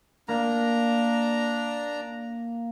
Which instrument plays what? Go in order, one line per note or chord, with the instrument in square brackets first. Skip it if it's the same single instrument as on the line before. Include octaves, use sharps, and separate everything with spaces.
[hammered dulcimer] A#3 [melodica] D4 A#5